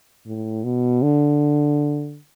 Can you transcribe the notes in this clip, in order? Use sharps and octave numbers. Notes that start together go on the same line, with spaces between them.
A2
B2
D3